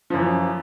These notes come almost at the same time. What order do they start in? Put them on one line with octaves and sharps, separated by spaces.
F3 F#2 E3